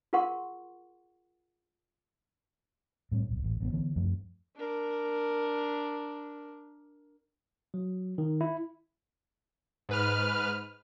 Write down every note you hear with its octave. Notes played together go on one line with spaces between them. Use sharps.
F4 G#4 A#4 F#5 C6 C#6
A2 G3 C4
D1 B1
A1
A1 A3 B3
D3 E3 B3
F#2 F3 A3
D4 A#4
F#3
D#3
E4
G#2 B4 F6